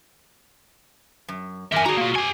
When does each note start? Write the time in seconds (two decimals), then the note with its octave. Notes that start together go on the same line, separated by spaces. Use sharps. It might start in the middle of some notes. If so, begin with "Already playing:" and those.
1.29 F#2
1.72 E2 A#4 E5 G#5
1.86 D4 F#4 G#4 A#5
1.98 A#3 F4
2.16 G4 G#5